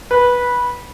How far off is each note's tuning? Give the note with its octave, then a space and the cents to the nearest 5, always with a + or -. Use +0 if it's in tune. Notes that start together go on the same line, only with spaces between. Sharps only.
B4 -15